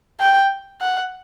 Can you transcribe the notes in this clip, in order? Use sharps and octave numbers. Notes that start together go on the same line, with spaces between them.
G5
F#5